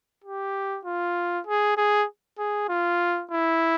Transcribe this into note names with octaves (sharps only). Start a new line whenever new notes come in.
G4
F4
G#4
G#4
G#4
F4
E4